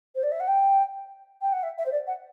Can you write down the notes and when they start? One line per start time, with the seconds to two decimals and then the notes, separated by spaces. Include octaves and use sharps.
0.15 C5
0.23 D5
0.32 E5
0.40 F#5
0.48 G5
1.42 G5
1.52 F#5
1.63 E5
1.78 E5
1.86 C5
1.92 D5
2.07 F#5